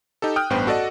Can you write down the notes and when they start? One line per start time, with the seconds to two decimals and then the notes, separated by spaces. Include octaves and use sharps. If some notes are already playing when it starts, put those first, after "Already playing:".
0.22 D#4 G4 A4
0.36 G5 D#6 F6 F#6
0.50 A1 G2 B3 C5 G5
0.67 F#4 A4 D5 D#5 F#5